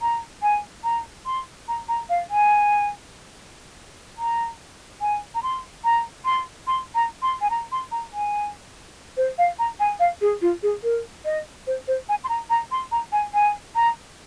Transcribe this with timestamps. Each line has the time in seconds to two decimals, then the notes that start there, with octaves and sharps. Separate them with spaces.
0.02 A#5
0.42 G#5
0.84 A#5
1.26 C6
1.68 A#5
1.88 A#5
2.09 F5
2.30 G#5
4.18 A#5
5.01 G#5
5.35 A#5
5.43 C6
5.84 A#5
6.25 C6
6.67 C6
6.95 A#5
7.22 C6
7.41 G#5
7.50 A#5
7.72 C6
7.91 A#5
8.13 G#5
9.17 C5
9.38 F5
9.59 A#5
9.80 G#5
10.00 F5
10.21 G#4
10.41 F4
10.63 G#4
10.83 A#4
11.25 D#5
11.67 C5
11.88 C5
12.09 G#5
12.24 C6
12.29 A#5
12.50 A#5
12.71 C6
12.92 A#5
13.12 G#5
13.34 G#5
13.75 A#5